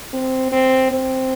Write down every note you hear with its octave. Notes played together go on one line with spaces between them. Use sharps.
C4
C4
C4